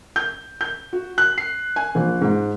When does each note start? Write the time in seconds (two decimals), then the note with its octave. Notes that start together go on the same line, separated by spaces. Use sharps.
0.16 G6
0.61 G6
0.93 F#4
1.18 F#6
1.38 C7
1.76 G#5
1.95 A#1
2.21 G#2